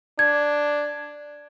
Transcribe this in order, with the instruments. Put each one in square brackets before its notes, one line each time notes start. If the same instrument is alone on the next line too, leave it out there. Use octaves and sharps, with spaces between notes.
[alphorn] D4 [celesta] G#6